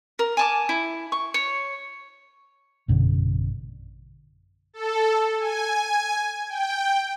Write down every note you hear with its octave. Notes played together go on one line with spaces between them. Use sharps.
A#4
G#5 A5 D6
E4
C#6
C#5
A1 F#2 B2 D3
A4
G#5
G5